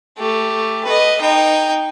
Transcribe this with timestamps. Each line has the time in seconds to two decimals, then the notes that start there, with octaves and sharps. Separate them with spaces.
0.18 A3 G4
0.85 B4 D#5
1.21 D#4 G5